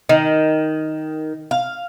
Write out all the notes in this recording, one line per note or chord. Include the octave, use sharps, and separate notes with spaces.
D#3
F5